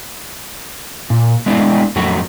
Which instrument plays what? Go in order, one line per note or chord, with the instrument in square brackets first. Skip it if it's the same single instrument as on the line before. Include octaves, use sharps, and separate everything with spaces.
[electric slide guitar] A#2
G#3 A3 B3 D4 E4
F2 F#3 A3 F#4